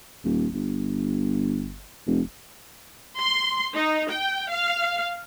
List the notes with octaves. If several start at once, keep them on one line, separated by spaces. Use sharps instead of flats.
D#1
G1
F1
C6
D#4
G5
F5